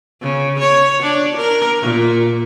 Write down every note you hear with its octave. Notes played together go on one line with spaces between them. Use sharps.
C#3
C#5
D4
A#4
A#2